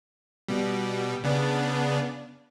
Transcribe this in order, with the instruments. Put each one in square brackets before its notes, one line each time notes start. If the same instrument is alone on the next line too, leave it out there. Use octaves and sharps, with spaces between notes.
[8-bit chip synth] B2 G3
C#3 B3 D4